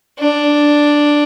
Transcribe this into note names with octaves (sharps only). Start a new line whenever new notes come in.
D4